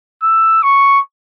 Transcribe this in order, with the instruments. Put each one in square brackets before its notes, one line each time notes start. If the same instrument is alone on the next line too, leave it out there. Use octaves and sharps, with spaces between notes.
[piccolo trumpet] E6
C#6